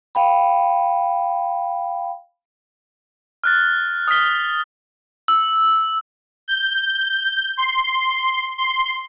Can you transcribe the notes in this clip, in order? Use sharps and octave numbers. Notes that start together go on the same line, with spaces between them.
F5 G5 B5
F6 F#6 A6
D#6 F6 F#6 B6 G7
E6
G6
C6
C6